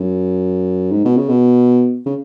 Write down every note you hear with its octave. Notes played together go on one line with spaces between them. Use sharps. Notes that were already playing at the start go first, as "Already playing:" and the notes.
Already playing: F#2
G#2
B2
C#3
B2
C#3